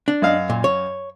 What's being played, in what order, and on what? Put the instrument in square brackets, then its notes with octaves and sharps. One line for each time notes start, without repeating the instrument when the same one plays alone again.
[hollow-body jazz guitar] D4
[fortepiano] F#2 D#5 F5
[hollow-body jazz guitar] A#2
C#5